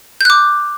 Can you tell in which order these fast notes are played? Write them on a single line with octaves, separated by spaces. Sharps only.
G6 F#6 D6